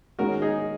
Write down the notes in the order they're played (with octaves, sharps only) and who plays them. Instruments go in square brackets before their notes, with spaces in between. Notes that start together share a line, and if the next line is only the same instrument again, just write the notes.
[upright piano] D#3 G#3 C#4 [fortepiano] F#4 A#4
[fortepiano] D#4 G#4